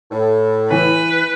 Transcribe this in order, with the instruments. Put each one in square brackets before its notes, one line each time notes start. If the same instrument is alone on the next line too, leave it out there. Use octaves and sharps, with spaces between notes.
[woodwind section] A2
[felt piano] E3 [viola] B4